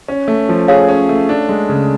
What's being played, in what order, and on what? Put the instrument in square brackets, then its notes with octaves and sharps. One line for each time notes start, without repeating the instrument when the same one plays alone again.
[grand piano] C#4
A3
F3
[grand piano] G#4 [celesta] C#5 F5
[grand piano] C#4
A3
D4
G#3
C#3